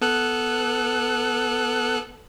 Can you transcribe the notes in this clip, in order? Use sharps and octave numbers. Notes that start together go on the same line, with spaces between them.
B3 A4 F#6